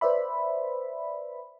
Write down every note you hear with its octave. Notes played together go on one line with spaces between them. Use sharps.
B4 C5 D5 E5 B5